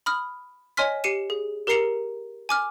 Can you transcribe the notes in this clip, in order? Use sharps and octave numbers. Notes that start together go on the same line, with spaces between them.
B5 D#6 F6
C#5 D#5 G#5 C6 F6 B6
G4 C7 C#7 D#7 E7
G#4
G4 A#4 A#5 C7 C#7 F7
G#5 D6 F6